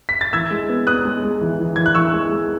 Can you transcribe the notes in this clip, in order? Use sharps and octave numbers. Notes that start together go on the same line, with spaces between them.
B6
A6
E3 E6 G#6
G#3
B3
B3 D#6 F#6
G#3
G#3
E3
E3
E3 G#6
F#6
E3 C#6 E6
G#3
G#3